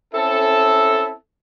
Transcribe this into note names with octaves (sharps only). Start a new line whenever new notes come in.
C4 C#4 E4 A4